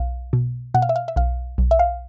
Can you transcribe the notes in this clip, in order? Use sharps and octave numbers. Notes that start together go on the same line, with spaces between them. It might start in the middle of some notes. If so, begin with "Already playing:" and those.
Already playing: B1 F5
B2
B2 F#5
F5
E5
F5
E5
B1 F5
B1
E5
F5